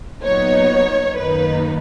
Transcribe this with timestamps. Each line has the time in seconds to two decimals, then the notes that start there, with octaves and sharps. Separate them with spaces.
0.23 A#2 F#3 B3 D#4 C#5
1.17 F#2 D#3 A#3 D#4 B4